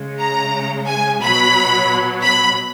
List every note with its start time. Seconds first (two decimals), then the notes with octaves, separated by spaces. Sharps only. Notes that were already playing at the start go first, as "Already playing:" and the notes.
Already playing: C#3 G#3
0.18 A#5
0.87 G#5
1.20 B2 F#3 B5
2.22 B5